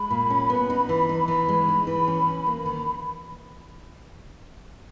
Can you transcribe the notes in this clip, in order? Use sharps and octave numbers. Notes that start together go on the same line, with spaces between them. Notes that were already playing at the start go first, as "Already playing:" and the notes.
Already playing: G#3 B5
A#2
C#4
B3
D#4
E3
D#4
E3 B5
G#3
D#4
E3
C#4
C#4
A#3
D#3